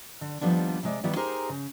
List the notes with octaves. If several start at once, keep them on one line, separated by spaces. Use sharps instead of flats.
D3
D#2 C3 F3 G3 B3 D4
C3 G#3 D5
D#3 G3 B3 E4
D#4 G4 G#4 A#4 C5
C#3